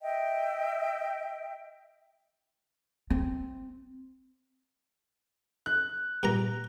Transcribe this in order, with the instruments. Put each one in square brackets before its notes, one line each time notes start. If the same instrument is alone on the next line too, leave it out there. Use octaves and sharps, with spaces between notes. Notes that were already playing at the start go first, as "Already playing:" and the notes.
[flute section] D#5 E5 G5
[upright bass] C4
[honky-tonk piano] F#6
[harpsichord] G2 A#2 A#5